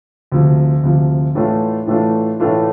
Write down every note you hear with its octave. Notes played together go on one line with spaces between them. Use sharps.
D2 C3 F3
D2 C3 F3
A2 E3 A3 D4 F4
A2 E3 A3 D4 F4
A2 E3 A3 D4 F4